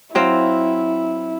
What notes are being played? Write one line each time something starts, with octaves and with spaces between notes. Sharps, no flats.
F#3 C4 E4 F5